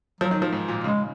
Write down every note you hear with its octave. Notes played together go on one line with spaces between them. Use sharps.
F3 F#3
D#3
F3
G#2
A#2
C#3 G#3